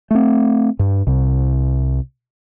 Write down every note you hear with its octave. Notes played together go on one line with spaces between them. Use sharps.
A3 C4
G2
C2 C3